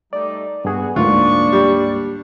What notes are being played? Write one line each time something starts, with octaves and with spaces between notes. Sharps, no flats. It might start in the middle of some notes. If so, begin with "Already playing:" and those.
G3 A3 D#4 D5
G2 B3 F#4 G#4
D2 G#2 A#3 D4 F4 C#6
G3